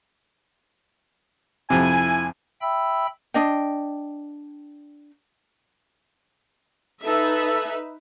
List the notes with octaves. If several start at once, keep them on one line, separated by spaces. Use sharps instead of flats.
F2 C3 E4 G#5
E5 G5 B5 E6
D4 D#5 G5
D#4 A4 B4 E5